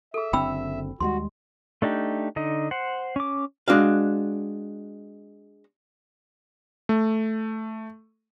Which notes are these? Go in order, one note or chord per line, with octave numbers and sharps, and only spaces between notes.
G#4 A4 E5
F#1 D3 C4 G5 B5 E6
D#2 G3 G#3 F#4 C6
A3 D4 D#4 G4
D3 D#4 D#5
C5 F#5
C#4 D6
G#3 D4 F#4 F5
A3